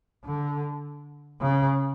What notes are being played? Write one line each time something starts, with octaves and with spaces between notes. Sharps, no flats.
D3
C#3